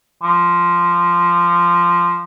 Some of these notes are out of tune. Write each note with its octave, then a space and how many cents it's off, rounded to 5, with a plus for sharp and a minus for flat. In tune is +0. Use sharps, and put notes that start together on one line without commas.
F3 -10